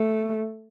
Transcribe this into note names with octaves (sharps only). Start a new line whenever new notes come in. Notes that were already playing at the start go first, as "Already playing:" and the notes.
Already playing: A3